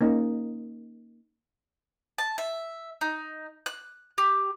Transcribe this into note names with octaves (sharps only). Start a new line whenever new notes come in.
A#3 C#4 D#4
A5
E5
D#4
F#6
G4